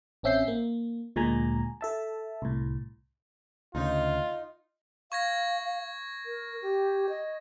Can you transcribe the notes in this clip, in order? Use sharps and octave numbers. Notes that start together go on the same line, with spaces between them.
A1 C4 C#4 E5 G6 C7
A#3
D2 A#2 G#3 G#5 A#5
A4 E5 A5
C2 A2
D2 C#3 D#4 F4
F5 C#6 G#6 A#6
A#4
G4
D#5